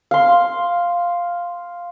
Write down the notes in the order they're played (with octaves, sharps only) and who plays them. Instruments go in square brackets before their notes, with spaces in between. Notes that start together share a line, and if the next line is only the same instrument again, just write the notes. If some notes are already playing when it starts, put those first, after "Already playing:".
[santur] F5 C6